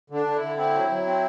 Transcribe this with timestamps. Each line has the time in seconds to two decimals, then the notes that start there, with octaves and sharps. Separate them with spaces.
0.10 D3 D4
0.26 D3
0.36 D3 E4
0.57 C4 E4
0.74 F#3
0.89 F#3
1.06 C4